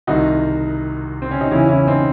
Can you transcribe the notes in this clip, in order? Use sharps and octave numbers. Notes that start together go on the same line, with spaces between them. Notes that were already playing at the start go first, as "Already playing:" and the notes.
C2 C3 D#3 D#4 F#4
C4
C#4
D#4
E2 C#3 E3 C#4 E4
C#4 E4
C4 D#4